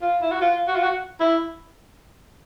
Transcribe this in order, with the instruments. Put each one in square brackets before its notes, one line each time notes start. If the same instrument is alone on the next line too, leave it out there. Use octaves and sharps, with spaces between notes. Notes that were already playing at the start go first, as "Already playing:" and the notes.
[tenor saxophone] F4
E4
F#4
F4
F#4
F4
F#4
E4